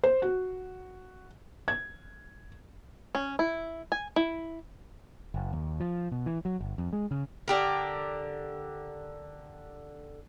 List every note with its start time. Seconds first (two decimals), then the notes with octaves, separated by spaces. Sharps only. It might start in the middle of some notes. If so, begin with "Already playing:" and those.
0.04 C5
0.22 F#4
1.68 G#6
3.15 C#4
3.39 E4
3.92 G#5
4.16 E4
5.34 F#1
5.53 D#2
5.80 F3
6.12 B2
6.26 E3
6.45 F#3
6.61 G1
6.78 F2
6.93 G#3
7.11 C#3
7.48 D3 G4 A#4